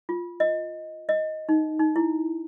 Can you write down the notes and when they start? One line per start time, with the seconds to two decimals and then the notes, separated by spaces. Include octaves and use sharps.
0.09 F4
0.40 D#5
1.09 D#5
1.49 D#4
1.80 D#4
1.96 E4